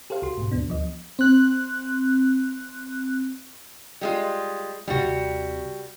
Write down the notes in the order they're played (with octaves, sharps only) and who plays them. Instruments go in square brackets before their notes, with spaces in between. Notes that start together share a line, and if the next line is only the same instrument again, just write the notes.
[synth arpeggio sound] G4 A4 C5 F5
C2 F#4 C6
G#2 B2
D#2 B3 D4
D2 F3 D#5
[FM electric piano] C4 F#6
[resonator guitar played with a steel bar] G3 G#3 F4
[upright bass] D#2 C3 [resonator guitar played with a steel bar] G3 F#4